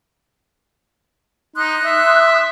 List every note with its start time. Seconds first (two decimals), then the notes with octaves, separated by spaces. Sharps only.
1.56 D#4 C6 D#6 F#6
1.85 E5